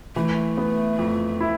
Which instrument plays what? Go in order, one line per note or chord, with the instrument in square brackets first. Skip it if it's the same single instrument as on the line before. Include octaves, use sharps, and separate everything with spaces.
[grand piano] E3 [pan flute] A3
[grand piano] B3
F2
E4